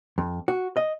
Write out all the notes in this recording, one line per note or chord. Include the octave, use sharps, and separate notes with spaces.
F2
F#4
D#5